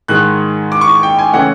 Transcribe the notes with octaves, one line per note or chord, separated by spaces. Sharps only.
G#2 D#3 G#3 F#6
D6
C#6
G5
G#5
C#3 E3 A3 C#4 F#5